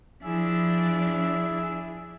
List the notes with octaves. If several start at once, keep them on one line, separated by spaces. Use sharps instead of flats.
F3 D4 E4 G#4 E5